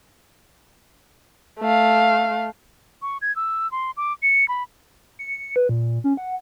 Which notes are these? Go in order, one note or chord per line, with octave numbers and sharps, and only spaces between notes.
A3 F5
C#6
G#6
E6
C6
D6
C#7
B5
C#7
B4
A#2
C#4
F#5